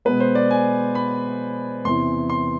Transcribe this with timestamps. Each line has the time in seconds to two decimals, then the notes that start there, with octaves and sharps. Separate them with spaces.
0.05 B2 G#3 B3 B4
0.20 C5
0.35 D5
0.51 G#5
0.95 B5
1.85 E2 C3 E3 C6
2.30 C6